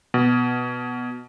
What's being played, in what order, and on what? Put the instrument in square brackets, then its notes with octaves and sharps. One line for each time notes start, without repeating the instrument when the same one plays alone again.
[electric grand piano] B2